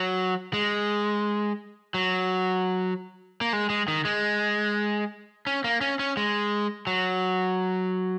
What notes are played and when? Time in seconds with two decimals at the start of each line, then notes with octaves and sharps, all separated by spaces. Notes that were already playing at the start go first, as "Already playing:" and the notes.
Already playing: F#3
0.53 G#3
1.94 F#3
3.41 A#3
3.53 G#3
3.70 G#3
3.88 D#3
4.05 G#3
5.47 C#4
5.64 A#3
5.81 C#4
5.99 C#4
6.17 G#3
6.87 F#3